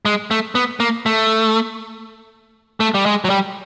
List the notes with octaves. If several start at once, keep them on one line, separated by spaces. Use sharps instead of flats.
G#3
A3
B3
A#3
A3
A3
G3
G#3
F#3
G3